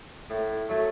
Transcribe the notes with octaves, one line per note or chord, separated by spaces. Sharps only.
A2
F#3 A3